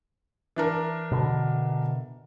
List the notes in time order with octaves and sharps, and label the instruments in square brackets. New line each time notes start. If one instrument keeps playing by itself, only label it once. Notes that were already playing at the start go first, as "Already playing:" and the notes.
[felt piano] E3 D4 A#4
[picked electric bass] B2 D3